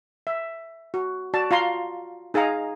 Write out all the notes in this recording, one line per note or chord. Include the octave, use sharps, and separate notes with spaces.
E5
F#4
F#4 D5 A5
F4 F5 A#5 C6
D#4 G#4 D#5 F5 A#5